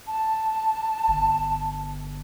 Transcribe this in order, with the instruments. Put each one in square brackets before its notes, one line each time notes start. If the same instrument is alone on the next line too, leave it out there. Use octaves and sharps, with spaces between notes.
[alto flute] A5
[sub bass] G1